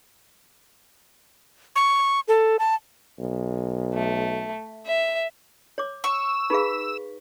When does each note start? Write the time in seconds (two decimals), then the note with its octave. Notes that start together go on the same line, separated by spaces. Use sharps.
1.76 C#6
2.28 A4
2.59 A5
3.19 B1
3.94 A3
4.86 E5
5.78 C#5 D6
6.04 C#6 E6
6.50 D#4 G#4 B4 F5